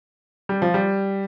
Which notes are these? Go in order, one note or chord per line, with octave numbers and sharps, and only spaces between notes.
G3
F3
G3